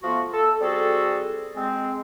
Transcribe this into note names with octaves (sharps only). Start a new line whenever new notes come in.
F3 A3 B3 F4 F#4
A4
G3 C4 F#4 G#4 A4
G#3 C4